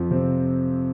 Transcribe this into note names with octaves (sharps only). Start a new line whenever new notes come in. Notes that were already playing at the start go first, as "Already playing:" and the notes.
Already playing: F2 F3
C3 C4